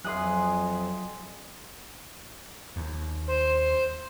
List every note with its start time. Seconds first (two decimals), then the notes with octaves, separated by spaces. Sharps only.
0.04 F2 F#3 G#4 E5 C6 D#6 F#6
2.76 D#2
3.28 C5